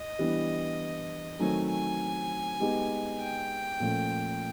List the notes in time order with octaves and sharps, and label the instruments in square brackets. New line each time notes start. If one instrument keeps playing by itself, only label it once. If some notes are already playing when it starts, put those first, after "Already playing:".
Already playing: [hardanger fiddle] D#5
[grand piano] E3 G3 B3 D4
[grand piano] D#3 F#3 A3 C4 [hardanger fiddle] G#5
[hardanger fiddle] G#5
[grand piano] G#3 B3 D#4 G4
[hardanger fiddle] G5
[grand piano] A#2 F3 A3 C#4